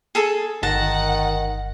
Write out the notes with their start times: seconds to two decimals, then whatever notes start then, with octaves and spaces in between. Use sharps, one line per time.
0.15 G#4 A4 A5
0.63 G1 D#3 F#5 A5 F#6 A#6